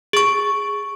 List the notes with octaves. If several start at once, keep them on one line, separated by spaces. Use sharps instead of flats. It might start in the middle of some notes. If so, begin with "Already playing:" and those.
G#4 C#6